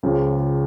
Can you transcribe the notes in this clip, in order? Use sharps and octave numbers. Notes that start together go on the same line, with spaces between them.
C#2 C#3 F3